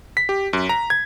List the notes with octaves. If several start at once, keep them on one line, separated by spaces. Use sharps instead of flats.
B6
G4
F#2
A#5
G#6